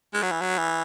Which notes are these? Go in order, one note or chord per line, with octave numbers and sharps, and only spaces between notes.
G#3
F#3
E3
F#3
E3